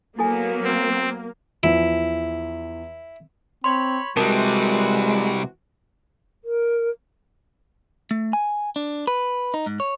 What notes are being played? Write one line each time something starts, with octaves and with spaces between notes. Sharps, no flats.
F#3 A#3 B3 E4 A4 G#5
C4
E2 E3 F3 E4
C4 C#5 B5 C6
C3 E3 G3 G#3 C4 F#4 A#4 A5
A#4
A3
G#5
D4
B4
D#4
G#2
C#5